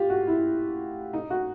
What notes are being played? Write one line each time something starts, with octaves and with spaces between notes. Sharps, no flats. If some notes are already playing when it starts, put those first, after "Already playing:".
Already playing: F4 G4
F#4
E4
D#4
F#4